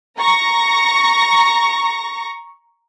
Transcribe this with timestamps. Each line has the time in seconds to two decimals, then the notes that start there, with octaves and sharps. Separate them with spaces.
0.19 A#5 C#6 A#6